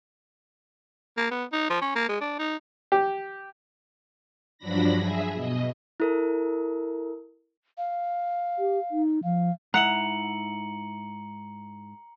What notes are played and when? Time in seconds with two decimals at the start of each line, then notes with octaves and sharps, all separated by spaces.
1.17 A#3
1.31 B3
1.52 D#4
1.70 F3
1.81 C#4
1.95 A#3
2.09 G#3
2.21 D4
2.39 D#4
2.92 G4
4.58 G2 F3 F#3 D4 B5 A#6
4.98 G#4 E5
5.34 B2 D#5
6.00 E4 A4 A#4
7.78 F5
8.59 G4
8.91 D#4
9.24 F3 F5
9.74 G#2 E4 F#5 A#5 C#7 F#7